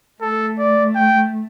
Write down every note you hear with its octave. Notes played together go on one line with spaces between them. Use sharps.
A3 A4
D5
G5